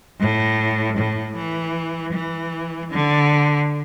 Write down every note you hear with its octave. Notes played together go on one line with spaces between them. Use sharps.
A2
A2
E3
E3
D3